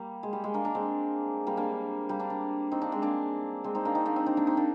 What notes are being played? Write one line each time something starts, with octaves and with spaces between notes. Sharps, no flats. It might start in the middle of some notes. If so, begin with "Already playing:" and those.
Already playing: G3 A#3
G#3
G3
G#3
A#3 D4
A#3 D4
G#3 C4
G3 A#3
A#3 D4
G3 A#3
A#3 D4
A#3 D4
C4 D#4
A#3 D4
G#3 C4
A#3 D4
G#3 C4
C4 D#4
A#3 D4
C4 D#4
A#3 D4
C4 D#4
C4 D#4
A#3 D4
C4 D#4
A#3 D4